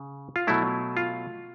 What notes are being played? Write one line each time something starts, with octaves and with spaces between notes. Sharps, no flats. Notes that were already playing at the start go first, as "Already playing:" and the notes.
Already playing: C#3
F4
B2 F#3 A3 E4
F4